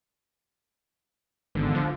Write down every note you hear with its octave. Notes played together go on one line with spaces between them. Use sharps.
G#1 D3 E3 G#3 B3
F3